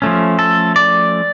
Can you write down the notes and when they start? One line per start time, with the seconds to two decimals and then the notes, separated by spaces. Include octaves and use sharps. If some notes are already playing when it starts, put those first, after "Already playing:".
0.02 F3 A3 C#4
0.39 A4
0.76 D5